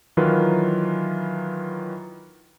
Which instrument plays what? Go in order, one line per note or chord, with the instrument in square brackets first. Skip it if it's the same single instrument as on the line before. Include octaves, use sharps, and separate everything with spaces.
[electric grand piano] D#3 E3 F#3 F4 A#4 B4